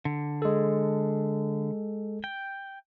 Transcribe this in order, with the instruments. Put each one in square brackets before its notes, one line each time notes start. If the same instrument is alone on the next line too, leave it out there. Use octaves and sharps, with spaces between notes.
[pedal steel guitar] D3
[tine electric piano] G#3 A4
[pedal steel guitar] G5